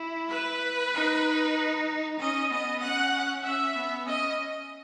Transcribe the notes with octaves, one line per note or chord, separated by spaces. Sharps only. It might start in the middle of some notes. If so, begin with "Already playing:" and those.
Already playing: E4
B4
D#4
C#4 D#5
B3 D#5
C#4 F#5
C#4 E5
B3
C#4 D#5